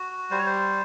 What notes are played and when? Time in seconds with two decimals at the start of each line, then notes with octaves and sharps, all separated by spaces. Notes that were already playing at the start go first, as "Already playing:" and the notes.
Already playing: F#4
0.31 G3 C5
0.38 C#5
0.46 C5